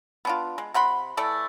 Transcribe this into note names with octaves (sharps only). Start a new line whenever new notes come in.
B3 D4 F4
G#3
C3 F#5 B5 C6
E3 A3 A4 D5